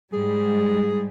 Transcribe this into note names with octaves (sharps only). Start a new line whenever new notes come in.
G#2 G3 G#4